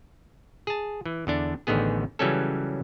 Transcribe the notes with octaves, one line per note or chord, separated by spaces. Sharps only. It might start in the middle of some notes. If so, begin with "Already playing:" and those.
G#4 A5
E3
E2 D3 D4
A1 D3 D#3 B3 G#4
C#3 E3 F#3 G3 C#4 A4